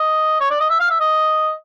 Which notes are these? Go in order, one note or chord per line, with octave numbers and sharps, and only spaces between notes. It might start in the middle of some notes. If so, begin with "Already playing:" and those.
Already playing: D#5
C#5
D5
D#5
E5
F5
E5
D#5